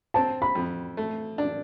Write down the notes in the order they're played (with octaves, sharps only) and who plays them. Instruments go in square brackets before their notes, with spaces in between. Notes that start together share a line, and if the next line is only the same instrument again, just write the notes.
[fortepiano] C4 [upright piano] A5
[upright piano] B5
[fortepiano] F2
A3
D4